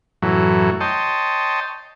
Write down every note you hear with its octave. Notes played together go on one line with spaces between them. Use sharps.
F#2 A2 E3 F#3
C#5 D#5 G5 A5 C6